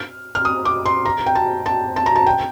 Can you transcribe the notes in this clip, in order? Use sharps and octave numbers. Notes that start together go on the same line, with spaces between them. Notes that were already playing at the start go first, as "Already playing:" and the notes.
Already playing: F6
F6
D#6
D6
C6
A#5
G5
A5
A5
A5
A#5
A5
G5